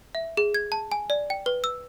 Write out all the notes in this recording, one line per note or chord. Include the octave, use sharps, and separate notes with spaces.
E5
G#4
G#6
A5
G#5
D5
G5
B4
E6